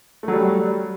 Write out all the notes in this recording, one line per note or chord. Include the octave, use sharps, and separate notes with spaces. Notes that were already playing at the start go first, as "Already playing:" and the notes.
F#3 G3 A3